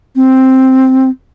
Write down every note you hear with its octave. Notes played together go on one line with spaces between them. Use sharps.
C4